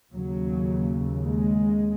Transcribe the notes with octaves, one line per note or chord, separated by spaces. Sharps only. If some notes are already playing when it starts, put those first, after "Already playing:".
D#2 C#3 F#3
G#3